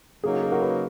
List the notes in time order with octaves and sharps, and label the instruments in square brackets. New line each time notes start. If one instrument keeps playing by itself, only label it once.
[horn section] C#3 F#3 A#3 D#4 [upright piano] G#4
[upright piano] F#4
G#4
F#4 A#4
G#4 B4